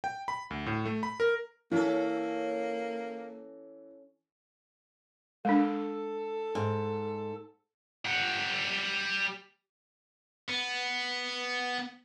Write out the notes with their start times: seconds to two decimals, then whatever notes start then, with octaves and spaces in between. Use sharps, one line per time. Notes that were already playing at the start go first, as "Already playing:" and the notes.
0.04 G5
0.28 B5
0.50 D2
0.66 A2
0.85 A3
1.03 B5
1.20 A#4
1.71 E3 A#3 C#4 A4
5.45 G#3 D4 A4
6.55 G#2
8.05 G3 F#5
10.49 B3